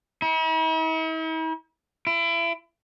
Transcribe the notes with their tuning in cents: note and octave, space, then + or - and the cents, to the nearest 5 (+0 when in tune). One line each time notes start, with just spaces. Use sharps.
E4 -45
E4 +30